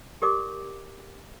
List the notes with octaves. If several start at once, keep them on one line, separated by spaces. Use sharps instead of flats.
G4 A#4 D5 D6